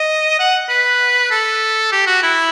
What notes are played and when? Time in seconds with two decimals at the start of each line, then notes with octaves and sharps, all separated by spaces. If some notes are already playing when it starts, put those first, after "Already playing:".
Already playing: D#5
0.40 F#5
0.69 B4
1.31 A4
1.92 G4
2.07 F#4
2.23 E4